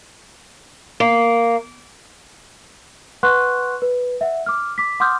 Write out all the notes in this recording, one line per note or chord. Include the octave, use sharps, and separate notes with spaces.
A#3
B4 F#5 C6 C#6 F#6
B4
E5 F#5
D6 F6
D6 B6
F#5 C6 D6 D#6 F6 G6